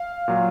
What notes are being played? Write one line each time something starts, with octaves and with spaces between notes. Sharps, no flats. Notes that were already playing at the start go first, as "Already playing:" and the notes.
Already playing: F5
A#2 F#3